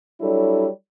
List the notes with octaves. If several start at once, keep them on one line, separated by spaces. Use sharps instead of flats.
F#3 G3 D4 E4 A4 C#5